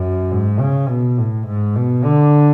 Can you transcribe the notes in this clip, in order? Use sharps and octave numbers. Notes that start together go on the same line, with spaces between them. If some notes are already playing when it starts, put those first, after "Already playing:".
Already playing: F#2
G#2
C#3
B2
A2
G#2
B2
D3